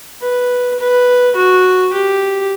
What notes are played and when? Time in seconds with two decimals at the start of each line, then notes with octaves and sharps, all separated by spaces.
0.21 B4
0.79 B4
1.36 F#4
1.93 G4